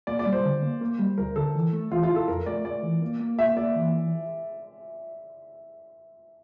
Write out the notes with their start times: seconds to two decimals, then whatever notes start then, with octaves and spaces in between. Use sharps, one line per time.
0.07 A#3 D5
0.19 D5
0.26 G3
0.32 C5
0.45 D3
0.63 A#3
0.81 A#3
0.99 G3
1.18 D2 A#4
1.36 D3 A4
1.55 E3
1.73 A3
1.91 E3 F4
2.03 F4
2.09 E4
2.16 A4
2.28 F2 A#4
2.46 A3 D5
2.65 A3 D5
2.83 E3
3.02 A#3
3.20 A#3
3.38 A#3 E5
3.57 A#3 D5
3.76 E3